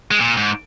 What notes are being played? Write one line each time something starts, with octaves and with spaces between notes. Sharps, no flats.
G#3
A#2
G#2